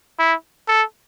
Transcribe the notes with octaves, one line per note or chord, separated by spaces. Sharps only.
E4
A4